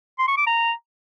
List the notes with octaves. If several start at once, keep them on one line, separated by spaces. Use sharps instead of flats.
C6
C#6
D6
A#5